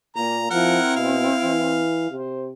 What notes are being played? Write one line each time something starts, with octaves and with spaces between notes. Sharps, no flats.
A#2 A#3 A#5
F3 C4 E4 A#4 F#5
B2 F5
E3
C3 C5